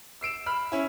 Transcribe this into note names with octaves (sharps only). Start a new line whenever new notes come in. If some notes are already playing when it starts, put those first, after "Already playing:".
E6 C7 D7 E7
B5 F6
C#4 E4